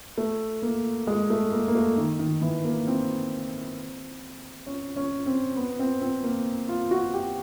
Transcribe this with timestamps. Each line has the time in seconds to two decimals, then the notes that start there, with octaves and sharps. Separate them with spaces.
0.18 A3
0.62 A#3
1.07 G#3
1.30 A3
1.52 A#3
1.68 A#3
1.75 A3
1.97 D#3
2.19 D#3
2.41 E3
2.65 A#3
2.87 C4
4.66 C#4
4.96 C#4
5.26 C4
5.56 B3
5.79 C4
6.02 C4
6.23 A#3
6.68 F4
6.91 F#4
7.14 G4